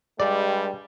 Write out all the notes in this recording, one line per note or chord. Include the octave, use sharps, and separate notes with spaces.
G2 G3 G#3 D5